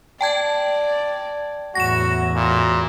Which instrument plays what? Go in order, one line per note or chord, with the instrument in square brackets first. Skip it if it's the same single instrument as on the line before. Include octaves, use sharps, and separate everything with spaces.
[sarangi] D5 [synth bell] G5 A5 G#6
[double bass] E2 A2 [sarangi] F#3 [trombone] F#4 [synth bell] A#6 E7
[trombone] A#2 [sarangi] F#4